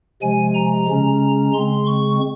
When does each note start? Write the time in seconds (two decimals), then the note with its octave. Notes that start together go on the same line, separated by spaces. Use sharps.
0.22 C3 F3 G#3 G#5
0.55 A#5
0.88 C#3 G#3 C#4
1.53 C#3 G#3 C4 C6
1.86 C#6